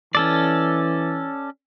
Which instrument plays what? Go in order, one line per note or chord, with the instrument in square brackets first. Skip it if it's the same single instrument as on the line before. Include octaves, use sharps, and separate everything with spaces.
[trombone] E3 [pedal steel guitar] C#4 A4 D5